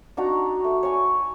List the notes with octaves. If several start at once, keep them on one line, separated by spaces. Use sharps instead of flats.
D4 D#4 F#4 A#5
A3
C#5 G#5